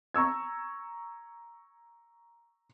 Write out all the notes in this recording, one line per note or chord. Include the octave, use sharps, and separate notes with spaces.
A#5 C#6 E6 G#6